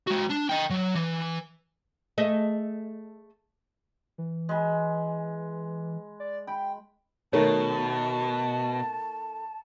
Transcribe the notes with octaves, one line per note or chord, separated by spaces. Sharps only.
G#3 F#4
D4
D#5 G5
F#3
E3
A3 G#4 D#5
E3
G#3 B5
D5
G5 B5
B2 D#3 A3 A#4 C#5 A5